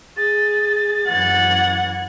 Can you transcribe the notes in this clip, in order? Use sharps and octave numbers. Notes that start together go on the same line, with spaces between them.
G#4 A6
F#2 E3 F#5 G#6